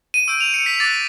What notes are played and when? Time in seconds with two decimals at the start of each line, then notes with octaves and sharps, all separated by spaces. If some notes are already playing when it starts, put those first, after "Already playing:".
0.14 D#7
0.27 C#6 E6 G6 D7
0.41 F7
0.54 C#7
0.66 B6
0.80 D6 F#6 A6